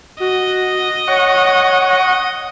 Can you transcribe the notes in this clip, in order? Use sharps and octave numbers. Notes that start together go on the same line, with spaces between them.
F#4 D#5
C#5 F#5 C#6